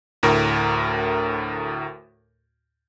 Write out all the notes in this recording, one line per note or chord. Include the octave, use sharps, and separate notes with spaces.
D2 A2 A#4